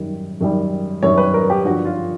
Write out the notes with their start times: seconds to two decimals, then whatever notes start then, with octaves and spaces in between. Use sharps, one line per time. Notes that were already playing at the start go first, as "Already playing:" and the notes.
Already playing: F#2 D#3 G3
0.41 F#2 D#3 G3
1.03 F#2 D#3 G3 C#5
1.18 B4
1.34 A#4
1.50 G4
1.65 G2 D3 F3 F#4
1.85 F4